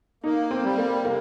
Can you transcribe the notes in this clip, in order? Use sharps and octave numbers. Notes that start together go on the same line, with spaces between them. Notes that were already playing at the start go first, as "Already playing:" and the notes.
A#3 D#4
C4
G3
A#3
C3 A#3